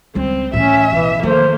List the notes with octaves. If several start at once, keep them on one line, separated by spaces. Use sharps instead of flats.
C#2 G3 C4
A2 E3 C#4 E5
B1 E3
D#3 F3 A3 A#3 C5